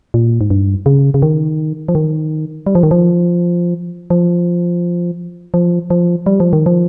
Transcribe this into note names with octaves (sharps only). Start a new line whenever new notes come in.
A#2
G#2
G2
C#3
C#3
D#3
F3
D#3
G3
F3
D#3
F3
F3
F3
F3
G3
F3
D#3
F3